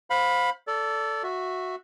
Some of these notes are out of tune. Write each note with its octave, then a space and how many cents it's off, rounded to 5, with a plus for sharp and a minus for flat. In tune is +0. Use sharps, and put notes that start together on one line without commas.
C5 +0 F5 +30 B5 +0
A4 +5 D5 -25
F#4 -10 E5 +0